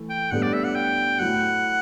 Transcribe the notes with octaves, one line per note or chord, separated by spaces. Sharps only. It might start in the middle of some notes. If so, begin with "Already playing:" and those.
Already playing: E3 A3 E4 A4
G5
A2 G3 B3 D4 A4 F#5
D5
E5
F#5
G5
F#3 A3 E4 F#5